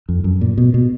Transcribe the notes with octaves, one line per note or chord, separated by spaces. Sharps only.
F2
F#2
A#2
B2
B2